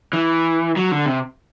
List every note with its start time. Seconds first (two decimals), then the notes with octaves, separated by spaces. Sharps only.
0.13 E3
0.77 F#3
0.92 D3
1.06 C3